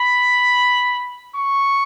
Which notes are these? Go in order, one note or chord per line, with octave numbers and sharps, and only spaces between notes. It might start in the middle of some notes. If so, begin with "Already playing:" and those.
Already playing: B5
C#6